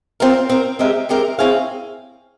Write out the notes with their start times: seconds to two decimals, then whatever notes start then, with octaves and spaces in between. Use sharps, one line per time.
0.20 C4 F4 A#4
0.49 C4 F4 A#4
0.79 G#3 C4 G4 A#4 E5
1.09 G#3 C4 G4 A#4 E5
1.39 C4 E4 G#4 C#5 F5